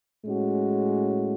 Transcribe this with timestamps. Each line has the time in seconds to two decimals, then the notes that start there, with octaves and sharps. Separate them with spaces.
0.25 A2 G#3 C#4 F#4